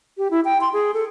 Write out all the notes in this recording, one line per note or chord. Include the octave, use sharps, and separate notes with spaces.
G4
E4
G5
C6
G#4
A4